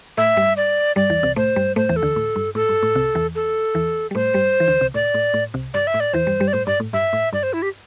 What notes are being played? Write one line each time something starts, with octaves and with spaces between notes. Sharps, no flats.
A2 A3 E5
G2 G3
D5
G2 G3 D5
E2 E3
C2 C3
A2 A3 C5
G2 G3
A2 A3 C5
E2 E3
A4
D2 D3
A2
G2
A2 A4
G2
A2
C2 C3
E2 E3
A4
E2 E3
G3
A2 A3 C5
G2 G3
E3
D2 D3
C2 C3
A2 D5
A2
A2
C2 C3
G2 D5
E5
A2
D5
E2 E3 C5
G2 G3
G2 G3
D5
A2 C5
G2 D5
A2
G2 E5
A2
G2 D5
C5
E4
G4